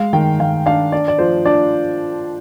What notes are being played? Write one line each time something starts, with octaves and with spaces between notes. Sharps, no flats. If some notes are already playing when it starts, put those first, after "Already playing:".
Already playing: G#3 F5
D#3 G5
D#3 F5
D4 F5
D4 D5
D5
F3 C5
D4 D5